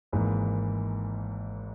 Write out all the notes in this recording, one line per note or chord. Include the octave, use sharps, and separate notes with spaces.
G#1 G#2 E3 A#3